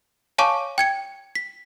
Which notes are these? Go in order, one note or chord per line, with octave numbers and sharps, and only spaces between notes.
C#5 F5 G#5 A5 C#6 D6
G5 G#6 C#7
B6